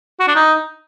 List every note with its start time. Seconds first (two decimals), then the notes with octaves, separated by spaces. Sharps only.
0.20 F#4
0.28 D4
0.35 D#4